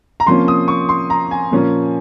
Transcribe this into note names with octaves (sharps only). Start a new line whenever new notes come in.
A#5
C3 F3 A#3 C#4 C6
D#6
C#6
C6
A#5
G#5
A#2 F3 A#3 C#4